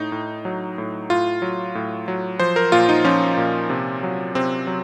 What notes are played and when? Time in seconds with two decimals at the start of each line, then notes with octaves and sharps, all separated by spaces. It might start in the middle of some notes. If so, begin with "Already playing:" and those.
Already playing: A2 D#4
0.12 A2
0.45 F#3
0.78 A2
1.10 A2 F4
1.42 F#3
1.75 A2
2.08 F#3
2.40 F3 C5
2.56 A#4
2.72 A#2 F4
2.89 D#4
3.04 F3 C#4
3.37 A#2
3.70 C3
4.03 F#3
4.35 C3 C4
4.67 F#3